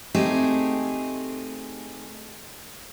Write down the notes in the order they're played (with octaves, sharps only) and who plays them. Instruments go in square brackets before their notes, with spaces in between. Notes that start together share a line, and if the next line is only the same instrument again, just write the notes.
[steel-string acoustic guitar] A3 C4 D#4 G4 G#4